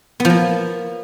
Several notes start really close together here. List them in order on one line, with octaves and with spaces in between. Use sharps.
B3 F3 A#3